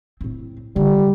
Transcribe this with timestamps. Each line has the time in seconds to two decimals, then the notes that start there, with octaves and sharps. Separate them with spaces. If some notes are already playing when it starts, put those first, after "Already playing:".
0.21 A2 C4
0.76 D3 D#3 G3